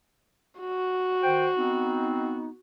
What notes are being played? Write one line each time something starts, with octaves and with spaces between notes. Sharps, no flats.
F#4
D#3 C5 G5
B3 C4 D#4